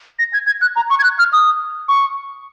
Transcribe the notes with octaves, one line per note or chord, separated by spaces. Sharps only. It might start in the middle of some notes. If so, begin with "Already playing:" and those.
A#6
G#6
G#6
F#6
A#5
C#6
G#6
F#6
F6
D#6
C#6